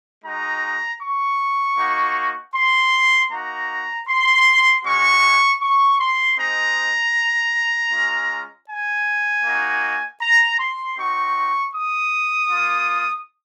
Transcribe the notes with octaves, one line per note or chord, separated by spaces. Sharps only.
G#3 D#4 F#4 A#5
C#6
A#3 D#4 F#4
C6
A#3 D#4 F#4 A#5
C6
G#3 C#4 F#4 C#6
C#6
C6
G#3 C4 D#4 A#5
G#3 C#4 F4
G#5
A#3 D#4 F#4
A#5
C6
C4 D#4 F#4 C#6
D#6
A#3 F4